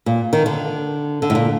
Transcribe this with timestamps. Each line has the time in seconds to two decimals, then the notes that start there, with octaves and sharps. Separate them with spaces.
0.06 A#2
0.33 D#3
0.46 D3
1.22 D3
1.30 A2
1.35 A#2